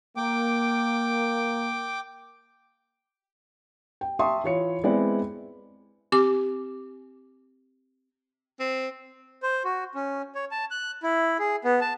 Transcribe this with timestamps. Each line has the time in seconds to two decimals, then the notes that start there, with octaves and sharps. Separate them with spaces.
0.17 A#3 G5 D6
4.01 G5
4.19 E5 G5 A5 C6 C#6 D#6
4.44 E3 F4 C#5 F5 C#7
4.84 G#3 B3 C4 E4 D5
6.12 C4 G4 D6
8.60 C4
9.43 C5
9.65 F#4
9.95 C#4
10.35 C#5
10.51 A5
10.71 F#6
11.03 E4
11.39 G#4
11.65 B3
11.81 A5